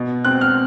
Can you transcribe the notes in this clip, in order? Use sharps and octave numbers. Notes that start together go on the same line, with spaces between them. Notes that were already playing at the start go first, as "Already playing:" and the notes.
Already playing: B2
C4 F#6
F6